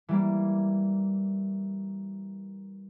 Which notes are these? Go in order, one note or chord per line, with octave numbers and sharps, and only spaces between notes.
E3 G3 A#3